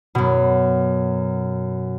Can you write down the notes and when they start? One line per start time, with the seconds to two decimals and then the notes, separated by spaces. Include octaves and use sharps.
0.15 F#2 B2